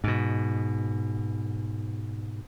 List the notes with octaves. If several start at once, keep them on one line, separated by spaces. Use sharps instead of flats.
G#2 B2